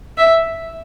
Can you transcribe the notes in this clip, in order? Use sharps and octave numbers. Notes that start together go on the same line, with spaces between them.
E5